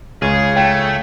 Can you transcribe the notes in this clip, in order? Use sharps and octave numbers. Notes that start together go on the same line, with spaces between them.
C#2 C#3 G#4
A3 G5